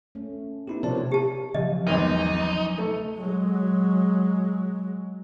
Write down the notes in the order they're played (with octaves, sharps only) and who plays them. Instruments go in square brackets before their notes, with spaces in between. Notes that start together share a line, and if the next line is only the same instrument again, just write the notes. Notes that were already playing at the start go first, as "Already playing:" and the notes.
[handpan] A3 C#4
[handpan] B3 [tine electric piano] D#4 E4 G4
[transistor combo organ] C3 [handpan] F3 G4 C#5 [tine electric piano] A#4 D5 A5
[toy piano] G4 A5
[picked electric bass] C#3 F3 F#3 [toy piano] D#5
[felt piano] G#1 E2 [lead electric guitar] D#4
[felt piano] A3
[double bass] F#3 G#3